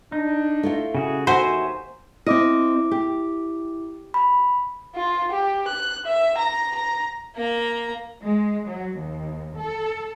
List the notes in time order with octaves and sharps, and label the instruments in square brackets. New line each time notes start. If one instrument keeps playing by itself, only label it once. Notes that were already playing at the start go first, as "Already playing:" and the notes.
[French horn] D4 [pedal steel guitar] D#4
[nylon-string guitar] A3 E4 F4
[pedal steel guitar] C#3 F#4 G#4
[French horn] D#2 [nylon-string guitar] F#4 [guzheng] C5 [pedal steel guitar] E5 G#5 A#5
[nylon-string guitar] C4 D#5 [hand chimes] E4 D6
[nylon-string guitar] G4
[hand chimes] B5
[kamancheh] F4
G4
F#6
E5
A#5
A#5
[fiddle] A#3 A#5
[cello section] G#3
F#3
D#2
A4